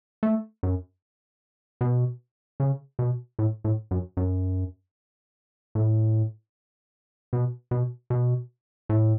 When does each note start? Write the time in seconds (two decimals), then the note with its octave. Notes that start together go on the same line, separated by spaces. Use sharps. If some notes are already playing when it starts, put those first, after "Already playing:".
0.23 A3
0.63 F#2
1.81 B2
2.60 C#3
2.99 B2
3.39 A2
3.65 A2
3.91 F#2
4.17 F#2
5.75 A2
7.33 B2
7.71 B2
8.10 B2
8.89 A2